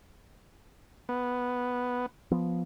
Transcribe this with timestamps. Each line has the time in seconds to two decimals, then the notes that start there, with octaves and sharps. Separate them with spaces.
1.09 B3
2.31 F3 B3